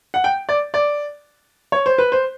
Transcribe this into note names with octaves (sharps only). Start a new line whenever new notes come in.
F#5
G5
D5
D5
C#5
C5
B4
C5